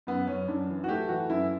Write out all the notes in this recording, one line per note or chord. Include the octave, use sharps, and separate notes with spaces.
F#2 B3
F#2 C#4
F#2 D4
E3
F#4
A3 G4
E3 F#4
F#2 E4